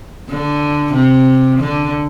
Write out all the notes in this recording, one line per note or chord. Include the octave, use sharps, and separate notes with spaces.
D3
C3
D3